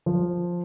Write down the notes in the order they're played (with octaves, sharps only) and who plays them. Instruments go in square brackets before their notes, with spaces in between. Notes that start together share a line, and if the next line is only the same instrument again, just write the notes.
[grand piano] F3